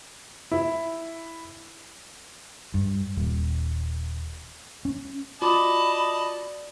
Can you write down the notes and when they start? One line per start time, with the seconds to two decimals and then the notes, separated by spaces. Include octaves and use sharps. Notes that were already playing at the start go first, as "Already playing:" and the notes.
0.52 E4
2.74 G2
3.17 D#1
4.85 C#4
5.42 F4 F#4 D5 D#5 A5 B5 D6